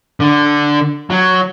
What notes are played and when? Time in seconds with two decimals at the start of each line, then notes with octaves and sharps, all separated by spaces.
0.20 D3
1.10 F#3